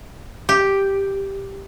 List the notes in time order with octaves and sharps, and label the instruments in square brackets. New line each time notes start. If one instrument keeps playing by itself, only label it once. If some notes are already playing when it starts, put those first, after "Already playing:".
[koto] G4